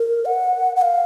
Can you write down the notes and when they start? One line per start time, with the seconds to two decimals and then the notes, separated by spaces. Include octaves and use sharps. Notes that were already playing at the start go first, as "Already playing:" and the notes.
Already playing: A#4
0.25 F#5
0.76 F#5
0.82 F5